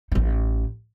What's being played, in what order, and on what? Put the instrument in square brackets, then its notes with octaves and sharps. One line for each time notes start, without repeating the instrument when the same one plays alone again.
[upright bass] A1 D#4